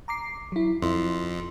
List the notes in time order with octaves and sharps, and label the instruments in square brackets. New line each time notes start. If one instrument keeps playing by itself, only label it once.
[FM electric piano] A#5 D6 C7
F#3 E4
[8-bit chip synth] F2 [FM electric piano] E4 C6